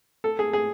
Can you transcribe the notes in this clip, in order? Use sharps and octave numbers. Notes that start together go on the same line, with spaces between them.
A4
G#4
G#4